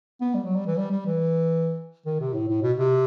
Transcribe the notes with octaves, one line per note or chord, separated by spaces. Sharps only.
B3
G3
F#3
G3
E3
G3
G3
E3
D#3
C3
A2
A2
B2
C3